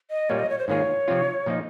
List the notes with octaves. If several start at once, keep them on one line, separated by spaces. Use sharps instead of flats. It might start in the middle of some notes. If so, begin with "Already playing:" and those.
D#5
A#2 G3 A#3 C#5
D#5
C#5
C5
G#2 D#3 A#3 F4 G#4 C#5
C3 F3 C4 F4
A#2 F3 A#3 D#4